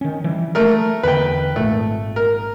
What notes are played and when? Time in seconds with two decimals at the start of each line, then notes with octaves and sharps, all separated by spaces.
0.01 D#3 C#4
0.24 E3 F3 G3
0.55 A3 A#4
1.03 E2 D3 D#3 B4 G5
1.56 G#1 A#2 A3
2.16 A#4